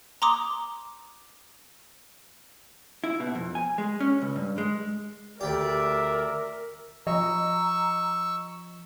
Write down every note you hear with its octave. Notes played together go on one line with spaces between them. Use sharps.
A#5 C6 D6 D#6
E4
B2
F2
G#5
G#3
C#4
C#2
G2
G#3
D2 G4 A#4 D5 E5
F3 D#5 A#5 C#6 E6